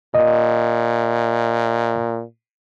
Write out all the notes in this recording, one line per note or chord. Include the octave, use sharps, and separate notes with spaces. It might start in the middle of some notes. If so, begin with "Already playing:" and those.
A#2 D#5